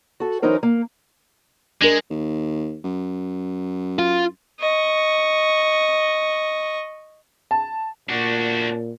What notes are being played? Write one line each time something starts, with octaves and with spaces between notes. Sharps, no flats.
F#4 A4
E3 F#3 C#4 D#4 A#4 C5
A#3
G#3 D4 A#4
D#2
F#2
F4
D#5 C#6
A5
A#2 D4 F#4